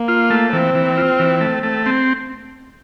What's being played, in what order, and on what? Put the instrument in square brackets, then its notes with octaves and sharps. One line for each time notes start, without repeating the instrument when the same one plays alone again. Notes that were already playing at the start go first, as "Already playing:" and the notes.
Already playing: [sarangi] A#3
[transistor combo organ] F4
A3
[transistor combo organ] E3 [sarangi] C4
[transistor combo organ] E3
F4
E3
A3
A3
C4